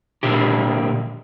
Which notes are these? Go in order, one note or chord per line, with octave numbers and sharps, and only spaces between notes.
A#2 D3 G4